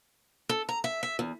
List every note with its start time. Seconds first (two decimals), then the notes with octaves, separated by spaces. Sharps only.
0.49 A4
0.69 A#5
0.84 E5
1.03 E5
1.19 E2